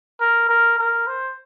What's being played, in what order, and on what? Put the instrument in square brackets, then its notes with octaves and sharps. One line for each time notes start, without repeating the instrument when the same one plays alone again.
[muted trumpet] A#4
A#4
A#4
C5